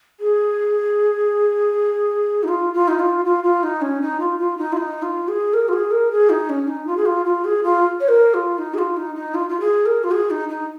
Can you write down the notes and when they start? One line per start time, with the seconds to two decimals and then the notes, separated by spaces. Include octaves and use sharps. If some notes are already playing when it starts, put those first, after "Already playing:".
0.20 G#4
2.43 D#4
2.48 F4
2.74 F4
2.88 D#4
2.99 F4
3.25 F4
3.44 F4
3.63 D#4
3.82 C#4
4.02 D#4
4.20 F4
4.39 F4
4.58 D#4
4.72 F4
4.77 D#4
5.02 F4
5.28 G#4
5.54 A#4
5.68 F4
5.73 G#4
5.91 A#4
6.11 G#4
6.30 D#4
6.49 C#4
6.68 D#4
6.87 F4
6.97 G#4
7.06 F4
7.25 F4
7.45 G#4
7.64 F4
8.00 C#5
8.08 A#4
8.34 F4
8.58 D#4
8.74 G#4
8.78 F4
8.97 D#4
9.15 D#4
9.34 F4
9.49 F4
9.60 G#4
9.86 A#4
10.04 F4
10.11 G#4
10.30 D#4
10.49 D#4